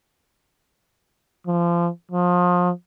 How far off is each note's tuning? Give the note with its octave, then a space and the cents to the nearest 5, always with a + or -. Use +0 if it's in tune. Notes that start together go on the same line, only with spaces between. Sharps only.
F3 -25
F3 +30